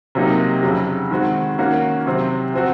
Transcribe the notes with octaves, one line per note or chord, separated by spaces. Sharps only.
C3 F#3 A#3 D#4
F2 C#3 F#3
D#3 G#3 C4 F#4
D#3 A#3 C#4 F#4
C3 F#3 C4
F3 C4 F#4